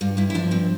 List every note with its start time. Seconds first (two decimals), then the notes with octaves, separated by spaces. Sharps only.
0.01 G2 F4
0.17 G2 E4
0.30 E4
0.34 F3 D4
0.51 G2 C4